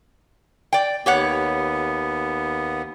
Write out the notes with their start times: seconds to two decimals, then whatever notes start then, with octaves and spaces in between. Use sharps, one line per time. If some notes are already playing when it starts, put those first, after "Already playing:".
0.73 D5 G5
1.06 D#2 B3 G4 C#5 F#5